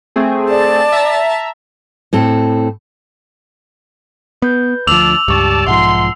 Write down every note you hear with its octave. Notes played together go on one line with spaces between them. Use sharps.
A3 C4 G#4
D5 A5
E5 A#5
A2 C4 A4
B3 B4 G6
D2 F3 D4 A5 D6 E6 F7 F#7
C#2 G2 G4 D5 A5 C#6
B1 G#2 F3 E5 F#5 A5 C6